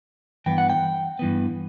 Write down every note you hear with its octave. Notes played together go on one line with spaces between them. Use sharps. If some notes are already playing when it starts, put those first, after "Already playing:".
G2 E3 B3 G5
F#5
G5
G2 E3 B3